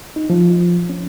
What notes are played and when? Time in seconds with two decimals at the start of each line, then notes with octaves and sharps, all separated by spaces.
0.16 D#4
0.30 F3
0.89 C#4